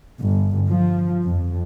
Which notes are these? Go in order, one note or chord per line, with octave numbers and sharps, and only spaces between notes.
G1
F3
F2